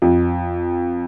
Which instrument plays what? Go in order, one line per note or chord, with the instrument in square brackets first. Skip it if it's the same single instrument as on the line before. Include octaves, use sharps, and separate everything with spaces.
[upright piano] F2